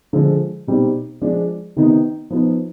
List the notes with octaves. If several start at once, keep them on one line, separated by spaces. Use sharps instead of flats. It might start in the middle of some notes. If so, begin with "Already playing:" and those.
D3 F3 G#3
B2 G3 C4 D#4
F3 G#3 D4
C3 D#3 B3 D#4
F3 B3 D#4